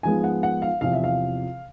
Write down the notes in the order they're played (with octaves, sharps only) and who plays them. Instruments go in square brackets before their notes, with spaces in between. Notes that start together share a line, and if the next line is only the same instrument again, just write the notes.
[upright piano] G#2 F3 G#3 B3 G#5
F#5
F#5
F5
E2 C3 F3 F5
E5
F5